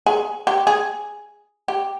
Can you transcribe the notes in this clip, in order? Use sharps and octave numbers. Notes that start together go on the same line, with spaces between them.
G#4
G4
G#4
G4